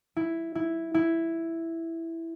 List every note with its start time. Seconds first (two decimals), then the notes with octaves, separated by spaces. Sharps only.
0.16 E4
0.55 E4
0.94 E4